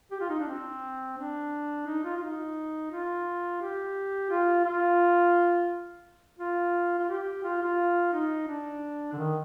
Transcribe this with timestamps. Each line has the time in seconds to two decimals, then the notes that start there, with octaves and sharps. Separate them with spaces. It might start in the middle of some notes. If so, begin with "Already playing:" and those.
0.11 G4
0.20 F4
0.29 D#4
0.39 D4
0.48 C4
1.18 D4
1.87 D#4
2.04 F4
2.17 F4
2.22 D#4
2.91 F4
3.62 G4
4.31 F4
4.65 F4
6.39 F4
6.98 F4
7.09 G4
7.44 F4
7.62 F4
8.13 D#4
8.48 D4
9.13 D3
9.18 D#3